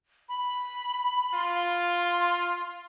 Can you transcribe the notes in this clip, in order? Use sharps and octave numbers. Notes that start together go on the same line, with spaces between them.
B5
F4 C6